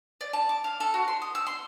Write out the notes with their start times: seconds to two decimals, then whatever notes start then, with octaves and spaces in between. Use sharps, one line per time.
0.21 D5
0.33 A5
0.49 D6
0.64 F5
0.80 A4
0.94 F#4
1.08 C6
1.22 D#6
1.35 E6
1.47 C6